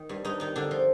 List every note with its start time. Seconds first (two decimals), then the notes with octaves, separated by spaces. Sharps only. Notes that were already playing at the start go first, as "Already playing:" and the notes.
Already playing: D#3
0.09 G2
0.25 G2 D#4
0.40 D#3 D#4
0.56 D3 D4
0.71 F3